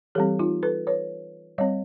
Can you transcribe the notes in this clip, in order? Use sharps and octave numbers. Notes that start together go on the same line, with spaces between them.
E3 G3 C4 G4 A4
D#4 F4
A4 B4
B4 C#5
G3 C4 C#5 D#5